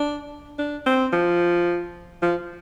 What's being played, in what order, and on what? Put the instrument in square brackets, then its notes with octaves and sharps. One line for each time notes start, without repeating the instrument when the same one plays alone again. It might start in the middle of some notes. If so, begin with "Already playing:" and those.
Already playing: [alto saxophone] D4
D4
C4
F3
F3